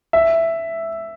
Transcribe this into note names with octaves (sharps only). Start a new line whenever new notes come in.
E5